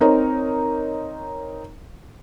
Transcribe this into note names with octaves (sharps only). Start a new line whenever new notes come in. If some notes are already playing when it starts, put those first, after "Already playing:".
C4 D#4 A#4 C#5